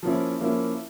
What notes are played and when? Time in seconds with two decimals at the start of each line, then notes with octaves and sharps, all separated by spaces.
0.03 F3 A#3 C#4 E4
0.41 F3 A#3 C#4 E4